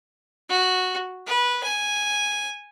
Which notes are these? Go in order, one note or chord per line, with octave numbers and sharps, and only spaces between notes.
F#4
B4
G#5